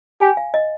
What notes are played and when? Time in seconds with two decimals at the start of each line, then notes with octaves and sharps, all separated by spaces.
0.21 G4 G#5
0.37 F5
0.54 D#5